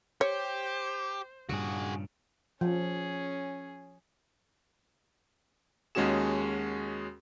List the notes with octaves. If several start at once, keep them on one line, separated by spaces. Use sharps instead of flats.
G4 C5 C#5
G2 A#2 C#3 F#4 G#4
F3 C#4 G#4
D#2 G#3 C#4 F#4 G#4 E7